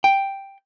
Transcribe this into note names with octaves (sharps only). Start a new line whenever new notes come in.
G5